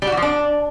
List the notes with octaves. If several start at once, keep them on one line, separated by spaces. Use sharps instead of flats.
G3
F#4
E3
F3
D4